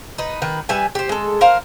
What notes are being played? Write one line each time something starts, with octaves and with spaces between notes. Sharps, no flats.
D#4 B4
D#3 B4
G3 B4 E5 G#5
G4 C5
G#3 A4
A#4 C5 F5